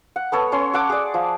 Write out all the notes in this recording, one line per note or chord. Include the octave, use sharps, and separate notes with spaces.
F#5
B3 A4 C#5
C#4 C#5 C6
A4 F#5 D6
G#4 D5
F3